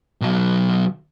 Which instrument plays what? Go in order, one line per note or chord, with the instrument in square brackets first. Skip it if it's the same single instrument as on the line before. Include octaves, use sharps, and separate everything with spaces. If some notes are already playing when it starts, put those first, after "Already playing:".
[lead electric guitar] B1 F#3